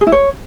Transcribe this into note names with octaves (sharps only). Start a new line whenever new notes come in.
G#4
E4
C#5